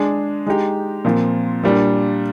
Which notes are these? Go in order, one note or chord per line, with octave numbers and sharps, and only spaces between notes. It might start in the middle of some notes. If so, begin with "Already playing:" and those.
Already playing: G#3 D4 G#4
G#3 D#4 G4
A#2 F3 C4
A#2 G3 D4